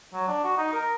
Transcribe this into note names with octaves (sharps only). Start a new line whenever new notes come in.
F#3
D4
F#4
D#4
A#4